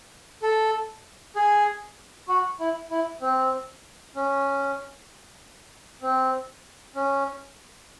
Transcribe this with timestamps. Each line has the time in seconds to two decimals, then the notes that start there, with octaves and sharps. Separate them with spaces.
0.42 A4
1.36 G#4
2.28 F#4
2.60 E4
2.90 E4
3.21 C4
4.15 C#4
6.02 C4
6.95 C#4